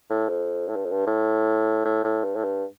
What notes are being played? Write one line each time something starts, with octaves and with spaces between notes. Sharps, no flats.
A2
F2
A2
G2
F2
G2
A2
A2
A2
G2
A2
G2